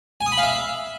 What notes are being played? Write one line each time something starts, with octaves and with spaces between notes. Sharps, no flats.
G#5
D#6
B5
F5
E5